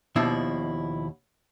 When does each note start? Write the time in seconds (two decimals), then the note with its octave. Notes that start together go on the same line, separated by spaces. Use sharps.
0.16 D#2 B2 F3 D4 E4 E5